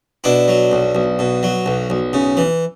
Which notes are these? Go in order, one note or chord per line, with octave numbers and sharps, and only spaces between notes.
B2 D4 E4
F#3
B1
B1
B2
F#3
B1
B1
C#3
E3